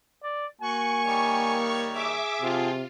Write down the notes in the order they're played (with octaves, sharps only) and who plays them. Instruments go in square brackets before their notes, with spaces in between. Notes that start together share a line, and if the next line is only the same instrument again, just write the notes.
[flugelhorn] D5
[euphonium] A#3 [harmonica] F#4 [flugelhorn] G#5 [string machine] C#6
[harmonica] D#3 G3 C#5
[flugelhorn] G#4 [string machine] E5 D6
[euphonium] C3 [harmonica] F3 C4 [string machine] F4